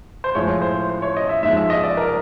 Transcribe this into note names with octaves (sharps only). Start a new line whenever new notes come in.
C5
A2 F3 G#3 C#5
C5
C5
C#5
D#5
E5
G#2 F3 G#3 E5
E5
D#5
D5
A#4